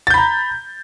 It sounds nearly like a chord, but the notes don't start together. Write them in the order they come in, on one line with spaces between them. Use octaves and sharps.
A6 G6 B5 A#5